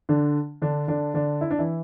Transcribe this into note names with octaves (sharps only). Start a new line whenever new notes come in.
D3 D4
D3 D4
D3 D4
D3 D4
E4
D4
E3 E4